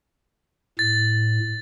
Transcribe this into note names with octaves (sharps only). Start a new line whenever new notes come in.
A2 A6